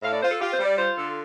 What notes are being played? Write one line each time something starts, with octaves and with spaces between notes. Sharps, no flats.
A2 F5
D5
F4 C5
A4
F4 G4
C5
G3
D5
F4 C5
D3 A4